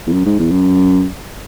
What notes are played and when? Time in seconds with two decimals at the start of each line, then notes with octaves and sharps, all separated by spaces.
0.07 E2
0.12 F#2
0.26 G#2
0.39 E2
0.51 F#2